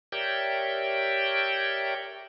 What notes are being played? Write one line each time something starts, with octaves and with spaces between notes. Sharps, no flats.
G4 A#4 C#5 D5 E5 G5